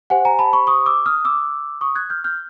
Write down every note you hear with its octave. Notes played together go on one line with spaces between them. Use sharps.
G4 C5 F#5 G#5
G#5 A#5
A5 B5
B5 C#6
C#6 D#6
D6 E6
D#6 F6
D6 E6
C#6 D#6
F#6 G#6
F6 G6
F6 G6